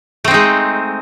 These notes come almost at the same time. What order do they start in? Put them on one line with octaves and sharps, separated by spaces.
A3 C4 D#4 G#3